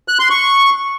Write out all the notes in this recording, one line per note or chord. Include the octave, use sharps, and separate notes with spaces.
F#6
C6
C#6